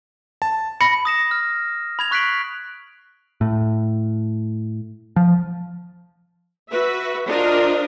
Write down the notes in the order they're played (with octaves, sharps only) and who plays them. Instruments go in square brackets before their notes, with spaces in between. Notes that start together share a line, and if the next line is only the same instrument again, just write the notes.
[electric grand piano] A5
[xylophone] B5 A#6 [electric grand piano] C#7
[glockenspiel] D#6 A#6 E7
F6
B5 G#6 F7
C#6 F#6 B6 C7 D7 F#7
[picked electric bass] A2
F3
[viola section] F#4 B4 E5
D4 F4 A#4 C5 D#5